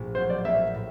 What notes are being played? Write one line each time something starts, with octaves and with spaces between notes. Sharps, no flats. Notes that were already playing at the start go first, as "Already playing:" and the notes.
Already playing: A#1 A2 A#3
F#3 C5
D5
A#3 E5
A2